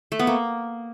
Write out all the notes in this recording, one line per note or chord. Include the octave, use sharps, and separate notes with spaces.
A3
B3
A#3